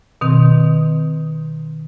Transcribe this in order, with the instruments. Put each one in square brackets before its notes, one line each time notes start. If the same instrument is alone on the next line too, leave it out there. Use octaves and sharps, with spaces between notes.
[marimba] B2 D#3 C4